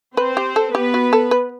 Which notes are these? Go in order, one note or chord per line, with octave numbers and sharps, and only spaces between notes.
C4 B4 C5
G4
A4
B3 G4 B4
F#4
A4
B4